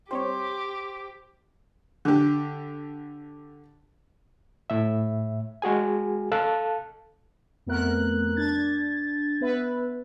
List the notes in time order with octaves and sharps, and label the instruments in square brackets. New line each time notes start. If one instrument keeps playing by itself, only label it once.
[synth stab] G3 C4 C#5 [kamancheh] G4 [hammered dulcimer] C5
[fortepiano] D3 G4
[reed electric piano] A2 E5
G#3 F#4 G#4 G#5
A4 F5 A5 F#6
[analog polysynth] F2 A3 B3 A#4 F#6
D4 G#6 A6
B3 B4 E5